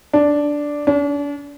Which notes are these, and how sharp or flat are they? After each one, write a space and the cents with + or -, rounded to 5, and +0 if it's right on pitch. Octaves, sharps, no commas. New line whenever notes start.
D4 -5
D4 -40